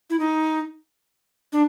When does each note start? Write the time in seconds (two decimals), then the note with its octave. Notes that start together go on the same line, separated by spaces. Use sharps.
0.10 E4
0.19 D#4
1.53 D4